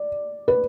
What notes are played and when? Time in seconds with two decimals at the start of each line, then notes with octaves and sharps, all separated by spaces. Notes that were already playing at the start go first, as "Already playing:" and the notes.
Already playing: D5
0.48 B4